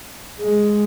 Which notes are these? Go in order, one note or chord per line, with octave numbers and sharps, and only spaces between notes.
G#3